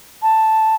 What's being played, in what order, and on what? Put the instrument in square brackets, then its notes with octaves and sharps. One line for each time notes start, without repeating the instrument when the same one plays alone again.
[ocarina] A5